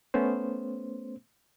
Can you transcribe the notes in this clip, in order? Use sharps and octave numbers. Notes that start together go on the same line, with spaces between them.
A3 B3 C#4 C5